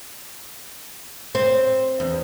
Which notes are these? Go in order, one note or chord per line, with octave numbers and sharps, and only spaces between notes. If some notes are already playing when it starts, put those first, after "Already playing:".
C4
E2